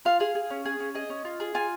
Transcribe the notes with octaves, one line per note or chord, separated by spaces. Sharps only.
F4 F5
G#4 F5
G#4
C#4
G#4
C#4
G#4 D#5
C#4
F4
G#4
F4 G#5